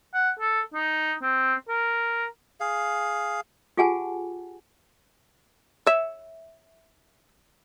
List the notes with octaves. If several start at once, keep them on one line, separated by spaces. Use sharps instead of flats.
F#5
A4
D#4
C4
A#4
G#4 F5
F4 G4 G#4 F#5 G#5 A5
C#5 E5